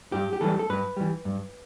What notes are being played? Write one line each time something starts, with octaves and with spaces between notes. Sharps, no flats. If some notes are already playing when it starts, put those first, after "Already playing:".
G2 G4
G4
E3 G3 A4
A4
G2 B4
E3 G3
G2